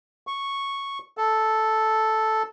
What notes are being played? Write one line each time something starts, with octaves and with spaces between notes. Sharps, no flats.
C#6
A4